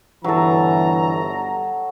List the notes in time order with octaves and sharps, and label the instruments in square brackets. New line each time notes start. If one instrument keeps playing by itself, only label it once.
[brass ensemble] G1 A#5 [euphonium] E3 [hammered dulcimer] F#3 A4